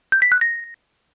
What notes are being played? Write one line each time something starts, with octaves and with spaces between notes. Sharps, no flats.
G6
B6
F#6
A#6